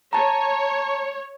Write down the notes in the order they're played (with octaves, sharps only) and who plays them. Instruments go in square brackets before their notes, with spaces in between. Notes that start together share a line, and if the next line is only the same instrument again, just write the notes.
[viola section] C#5 [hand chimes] A5 A#5